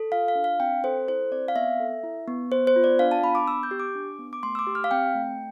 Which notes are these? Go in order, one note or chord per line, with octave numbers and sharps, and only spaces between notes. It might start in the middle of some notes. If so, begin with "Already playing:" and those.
Already playing: A4
F4 F5
F5
D4
F5
C4 G5
A4 C5
E4 C5
C4 D5
F5
B3 E5
A4
E4
B3
B3 C5
C5
F4
D5
D4 F5
A5
B3 B5
D6
B3 E6
G6
G4
D6
D4
B3
D6
A3 C6
E6
D6
G4
F6
F5
C4 G5
A3